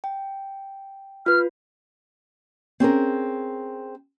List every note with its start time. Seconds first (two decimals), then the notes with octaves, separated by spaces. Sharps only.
0.04 G5
1.26 F4 B4 F6
2.80 C4 C#4 G#4 A#4